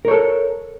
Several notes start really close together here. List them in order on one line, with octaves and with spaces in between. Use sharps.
A#4 C#5 A4